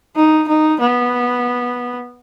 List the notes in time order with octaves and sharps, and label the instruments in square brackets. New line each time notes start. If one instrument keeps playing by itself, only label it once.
[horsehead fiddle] D#4
D#4
B3